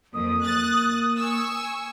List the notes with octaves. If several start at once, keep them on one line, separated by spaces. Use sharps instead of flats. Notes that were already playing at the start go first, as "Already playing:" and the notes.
F2 A#3 D#6
F#6 A6
G#5 C#6 E6